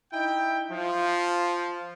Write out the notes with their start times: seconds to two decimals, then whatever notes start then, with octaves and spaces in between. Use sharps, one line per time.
0.12 D#4 E4 G5
0.71 F3